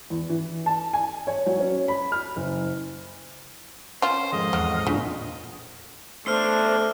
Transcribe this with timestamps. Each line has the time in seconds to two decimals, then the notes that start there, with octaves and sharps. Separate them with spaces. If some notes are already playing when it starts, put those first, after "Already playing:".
0.10 E2
0.29 E3
0.66 A5
0.93 G#5
1.27 C#5
1.46 F#3
1.60 C#4
1.88 B5
2.12 F6
2.36 F#1
4.02 C#4 F4 C5
4.32 F2 G#2 D#3 D#5
4.53 E2 F#3 F5
4.87 A#2 C#3 D4 F4
6.27 E2 A3 D4 C5 E6 F6